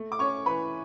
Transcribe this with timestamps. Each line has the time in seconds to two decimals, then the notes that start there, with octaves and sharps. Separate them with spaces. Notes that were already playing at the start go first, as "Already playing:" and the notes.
Already playing: A3
0.12 D6
0.19 C#4 C#5 C#6
0.46 E3 B4 B5